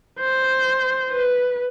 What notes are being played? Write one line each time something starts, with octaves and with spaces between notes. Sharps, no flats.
C5
B4